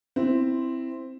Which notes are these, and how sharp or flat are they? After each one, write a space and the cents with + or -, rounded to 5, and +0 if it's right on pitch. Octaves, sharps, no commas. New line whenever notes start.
C4 +0 E4 +0